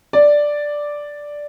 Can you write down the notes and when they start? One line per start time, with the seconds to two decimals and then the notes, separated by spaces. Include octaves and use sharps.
0.13 D5